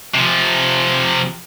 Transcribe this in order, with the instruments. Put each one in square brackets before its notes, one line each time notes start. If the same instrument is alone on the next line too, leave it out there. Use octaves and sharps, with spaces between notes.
[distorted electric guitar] C3 F3